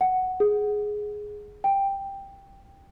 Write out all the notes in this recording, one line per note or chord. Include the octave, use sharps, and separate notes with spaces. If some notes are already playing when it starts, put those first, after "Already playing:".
F#5
G#4
G5